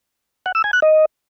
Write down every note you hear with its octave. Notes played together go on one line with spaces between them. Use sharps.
F#5
E6
G#5
F#6
D#5